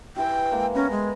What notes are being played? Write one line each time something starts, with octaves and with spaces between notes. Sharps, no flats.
E3 G4 G5
G#3 A#3
B3 C#4 A#5
G#3